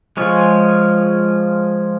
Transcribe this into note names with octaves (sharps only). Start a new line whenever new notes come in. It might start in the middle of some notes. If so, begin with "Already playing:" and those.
F3 G#3 F4 G#4 C#5